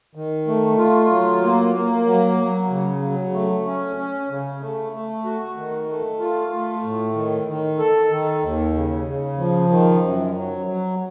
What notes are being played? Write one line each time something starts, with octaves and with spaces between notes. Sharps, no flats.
D#3
A3
F4
F#3
A#3
A#3
F#3
F#3
C#3
F#3
A3
C#4
C#4
C#3
A3
A3
F#4
D#3
A3
F4
A3
A2
D#3
D#3
A4
D#3
D#2
C#3
C#3
F3
D#3
F#2
F#3
F#3